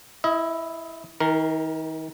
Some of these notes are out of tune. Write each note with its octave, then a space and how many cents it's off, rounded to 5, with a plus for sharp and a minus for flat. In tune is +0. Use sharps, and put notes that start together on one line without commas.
E4 +0 D#5 +30
D#3 +40 A#4 +0